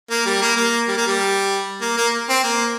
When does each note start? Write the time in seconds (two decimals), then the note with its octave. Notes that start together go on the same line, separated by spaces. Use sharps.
0.10 A#3
0.26 G3
0.42 A#3
0.56 A#3
0.88 G3
0.97 A#3
1.07 G3
1.81 A#3
1.97 A#3
2.29 C4
2.44 A#3